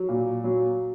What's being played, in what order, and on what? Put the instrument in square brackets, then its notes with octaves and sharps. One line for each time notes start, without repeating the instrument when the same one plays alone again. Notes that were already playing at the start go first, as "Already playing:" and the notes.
Already playing: [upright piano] F#3
A#2
F#3